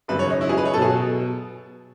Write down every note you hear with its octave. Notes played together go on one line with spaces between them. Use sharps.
G#1 F#2 C#3 B4
C#5
D#4
E4
G#4
B4
C#5
B2 F#3 B3 A4
G#4